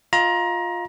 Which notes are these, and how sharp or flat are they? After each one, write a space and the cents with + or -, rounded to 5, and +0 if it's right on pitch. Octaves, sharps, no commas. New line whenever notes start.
F4 +10 D#5 +30 A#5 +25